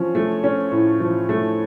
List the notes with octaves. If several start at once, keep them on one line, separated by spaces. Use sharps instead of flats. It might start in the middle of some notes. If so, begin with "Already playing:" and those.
Already playing: F3 C#4
A3
C#4
A2
F3
A3